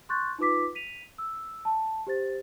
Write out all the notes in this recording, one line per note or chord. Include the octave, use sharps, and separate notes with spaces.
C6 C#6 F#6 G6 A6
D#4 F4 B4 D6 B6
B6 D#7 F7
E6
A5
G4 C5 A6